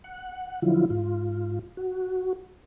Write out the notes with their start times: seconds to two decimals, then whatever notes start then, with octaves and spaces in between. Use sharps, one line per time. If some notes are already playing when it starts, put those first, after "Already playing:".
0.04 F#5
0.62 D3 F3 F#3 E4 F4
0.90 G#2 F4
1.77 F#4